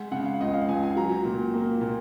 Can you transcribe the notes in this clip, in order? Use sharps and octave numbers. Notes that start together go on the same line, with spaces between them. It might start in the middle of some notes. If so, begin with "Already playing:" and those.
Already playing: G#3 F#5
C#3 F#5
F5
C#2 D#5
F5
C#2 G#5
G#5
F#3 A#5
A#2
A#3
A#2